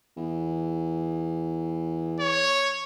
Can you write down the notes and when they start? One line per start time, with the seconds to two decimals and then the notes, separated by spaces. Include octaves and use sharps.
0.17 E2
2.20 C#5